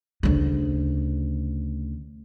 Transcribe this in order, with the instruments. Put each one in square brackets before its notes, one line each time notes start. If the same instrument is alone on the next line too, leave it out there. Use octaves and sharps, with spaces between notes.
[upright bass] D2 C#3